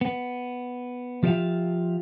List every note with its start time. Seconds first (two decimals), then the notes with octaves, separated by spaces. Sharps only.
0.01 B3
1.23 F3 F4 G4 C#5 E5 F5